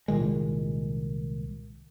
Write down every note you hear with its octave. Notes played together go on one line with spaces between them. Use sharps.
C2 A#2 D#3 G#3